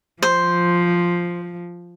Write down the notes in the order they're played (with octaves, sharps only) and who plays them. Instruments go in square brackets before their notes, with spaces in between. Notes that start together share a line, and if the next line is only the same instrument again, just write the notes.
[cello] F3 [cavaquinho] C5